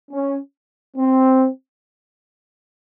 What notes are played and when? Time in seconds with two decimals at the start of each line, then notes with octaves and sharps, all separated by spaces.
0.12 C#4
0.97 C4